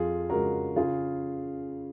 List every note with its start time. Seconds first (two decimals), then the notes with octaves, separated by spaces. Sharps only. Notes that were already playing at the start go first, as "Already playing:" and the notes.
Already playing: F2 F4 G#4
0.29 C#3 G#3 F#4 A#4
0.76 C#3 F4 G#4